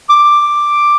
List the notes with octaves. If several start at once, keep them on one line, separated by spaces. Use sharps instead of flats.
D6